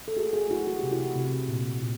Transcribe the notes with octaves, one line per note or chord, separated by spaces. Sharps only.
A4
A3 F#4 G#4
F#4 G#4
A3 E4 F#4
F#4
C3 G4
E4 F#4
C3
A#2
A#2